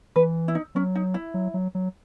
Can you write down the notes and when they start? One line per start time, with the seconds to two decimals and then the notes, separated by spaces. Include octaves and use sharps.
0.16 E3 B4
0.48 E4
0.55 D#4
0.75 F#3 C#4
0.95 D#4
1.14 E4
1.34 F#3
1.54 F#3
1.75 F#3